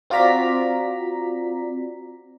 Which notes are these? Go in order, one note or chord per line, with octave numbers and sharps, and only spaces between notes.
C4 F4 F#4 D5 A#5 B6